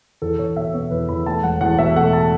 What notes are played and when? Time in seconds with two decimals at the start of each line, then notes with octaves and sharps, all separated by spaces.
0.22 E2 A4
0.39 E2 C#5
0.56 B2 E5
0.73 B3 C#5
0.91 E2 B4
1.09 E2 B5
1.26 A3 A5
1.43 E1 F#5
1.61 E2 F#5
1.78 B2 E5
1.96 A3 F#5
2.13 A5